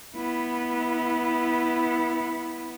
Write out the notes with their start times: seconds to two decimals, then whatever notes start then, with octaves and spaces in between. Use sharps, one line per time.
0.15 B3 E4